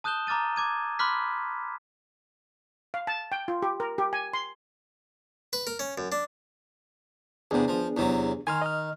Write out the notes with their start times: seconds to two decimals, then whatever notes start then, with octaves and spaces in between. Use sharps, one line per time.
0.04 A5 D#6 F#6 G6 E7 G7
0.27 A#5 D6 F6 A6 D#7
0.56 D6 G#6 D#7
0.99 B5 C6 D6 F6 F#6 B6
2.94 F5
3.07 A5
3.32 G5
3.48 F4
3.62 G4
3.80 A#4
3.98 G4
4.13 G#5
4.34 C6
5.53 B4
5.67 A#4
5.79 C#4
5.98 F#2
6.12 D4
7.51 E2 C3 B3 D4 G#4
7.68 F3
7.97 E2 C3 F#3
8.47 D#3 G#5 C6 F6
8.62 D#5 F6